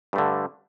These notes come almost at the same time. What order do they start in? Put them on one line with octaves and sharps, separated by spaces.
G2 A3 D3